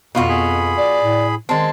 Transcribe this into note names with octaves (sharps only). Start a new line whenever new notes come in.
F2 B2 F4 F#4
G#4 B5
D5
A2
D#3 G#3 C4 A5